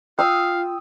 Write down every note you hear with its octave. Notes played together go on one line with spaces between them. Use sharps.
F4 F5 G5 D#6 E6